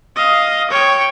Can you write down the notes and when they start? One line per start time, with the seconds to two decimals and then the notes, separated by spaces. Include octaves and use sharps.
0.16 D#5 F5
0.71 C#5 G5